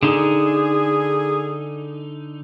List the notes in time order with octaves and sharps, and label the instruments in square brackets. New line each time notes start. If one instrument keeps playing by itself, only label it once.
[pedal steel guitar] D3 D#4 [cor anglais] G#4